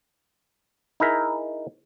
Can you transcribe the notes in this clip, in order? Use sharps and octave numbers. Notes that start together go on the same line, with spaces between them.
D#4 E4 G#4 A#4 E5